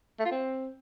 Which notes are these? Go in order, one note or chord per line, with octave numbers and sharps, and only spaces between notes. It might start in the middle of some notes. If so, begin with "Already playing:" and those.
A3
F4
C4